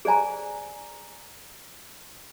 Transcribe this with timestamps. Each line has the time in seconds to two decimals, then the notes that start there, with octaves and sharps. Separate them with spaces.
0.05 G#4 C5 D5 G#5 A#5